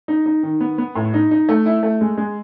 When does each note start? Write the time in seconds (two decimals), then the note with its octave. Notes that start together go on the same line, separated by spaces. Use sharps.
0.08 D#4
0.26 D#4
0.43 D#3
0.60 B3
0.78 B3
0.95 A2
1.14 D#4
1.31 D#4
1.49 A3
1.66 E4
1.83 A3
2.01 G#3
2.17 G#3